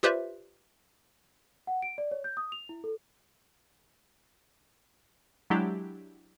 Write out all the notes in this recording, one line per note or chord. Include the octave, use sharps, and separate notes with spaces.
F4 G4 B4 C5 D5 E5
F#5
D7
D5
C#5
G6
D#6
F7
E4
A4
F#3 G#3 D4 E4 G4